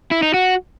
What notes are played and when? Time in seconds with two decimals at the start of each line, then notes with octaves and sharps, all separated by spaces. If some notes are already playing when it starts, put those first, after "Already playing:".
0.11 E4
0.23 D#4
0.34 F#4